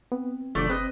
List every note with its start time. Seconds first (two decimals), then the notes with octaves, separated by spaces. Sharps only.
0.12 B3 C4
0.55 F#1 B2 D3 F3 A3 D5
0.70 C4 B4 D#5